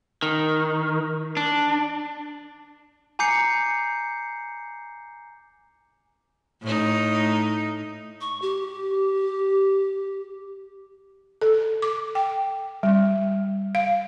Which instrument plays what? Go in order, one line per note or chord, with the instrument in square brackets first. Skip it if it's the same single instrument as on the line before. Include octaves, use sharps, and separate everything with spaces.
[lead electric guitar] D#3
D4
[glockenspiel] G#5 A#5 D6 G6 C7 C#7
[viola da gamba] A2 D#4
[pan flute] C#6
G4
[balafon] A4
D6
G5
G3
F5